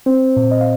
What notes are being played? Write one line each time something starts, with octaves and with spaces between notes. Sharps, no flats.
C4 C5
A#2
D#5
F5